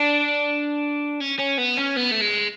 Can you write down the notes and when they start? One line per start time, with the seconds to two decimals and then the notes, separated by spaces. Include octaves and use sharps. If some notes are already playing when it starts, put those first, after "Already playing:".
Already playing: D4
1.21 C#4
1.39 C#4
1.58 B3
1.78 C#4
1.97 B3
2.12 A3
2.21 G#3